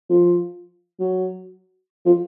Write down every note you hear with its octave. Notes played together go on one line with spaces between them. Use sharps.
F3
F#3
F3